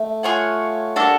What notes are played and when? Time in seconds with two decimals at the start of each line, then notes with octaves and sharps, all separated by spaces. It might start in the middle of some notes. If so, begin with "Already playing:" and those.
Already playing: A3
0.23 F4 G#4 C#5 F#5
0.95 G3 A#3 D4 F#4 A4